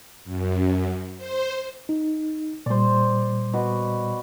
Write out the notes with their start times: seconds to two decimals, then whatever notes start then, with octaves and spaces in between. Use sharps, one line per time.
0.24 F#2
1.17 C5
1.89 D#4
2.66 A#2 G3 C5 D5
3.53 B2 B4